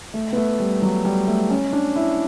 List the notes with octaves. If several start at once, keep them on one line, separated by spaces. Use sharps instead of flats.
A3
B3
A3
G3
F#3
G3
A3
C#4
D4
E4